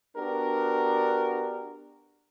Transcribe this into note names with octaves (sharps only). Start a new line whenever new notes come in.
B3 D4 F#4 G4 A#4